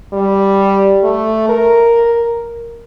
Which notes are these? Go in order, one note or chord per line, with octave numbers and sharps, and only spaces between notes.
G3
A3
A#4